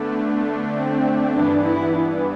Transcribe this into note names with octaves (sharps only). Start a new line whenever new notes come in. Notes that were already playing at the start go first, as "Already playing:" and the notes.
Already playing: D3 A3 B3 D4
C4
G2 E3 B3 D4
E4
D4